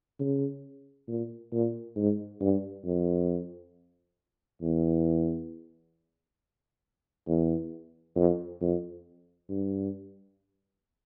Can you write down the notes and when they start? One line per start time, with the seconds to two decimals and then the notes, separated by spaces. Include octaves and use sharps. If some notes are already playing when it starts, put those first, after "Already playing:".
0.19 C#3
1.08 A#2
1.52 A#2
1.96 G#2
2.41 G2
2.85 F2
4.62 E2
7.27 E2
8.16 F2
8.61 F2
9.49 G2